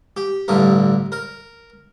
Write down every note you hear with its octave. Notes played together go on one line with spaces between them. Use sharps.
G4
A1 G2 D3 A#4
A#4